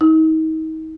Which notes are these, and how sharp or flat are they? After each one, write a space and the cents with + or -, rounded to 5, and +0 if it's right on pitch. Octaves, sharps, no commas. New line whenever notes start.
D#4 +35